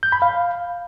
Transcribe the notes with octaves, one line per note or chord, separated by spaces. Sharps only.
G6
B5
F5